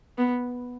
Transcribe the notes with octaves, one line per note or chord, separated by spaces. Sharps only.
B3